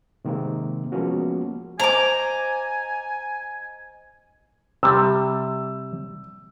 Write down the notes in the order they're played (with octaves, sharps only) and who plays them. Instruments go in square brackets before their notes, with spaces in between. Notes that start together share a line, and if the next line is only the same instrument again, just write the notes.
[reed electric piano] C3 D#3 G#3 A#3 C4
F3 G#3 A#3 B3 C#4 F#4
[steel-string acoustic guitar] C5 D#5 [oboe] G#5 [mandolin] A#5 D6
[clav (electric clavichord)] C3 G3 [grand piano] E6